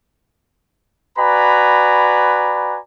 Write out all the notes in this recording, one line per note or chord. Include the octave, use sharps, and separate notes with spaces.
F#4 B4 D5 G#5 A#5 B5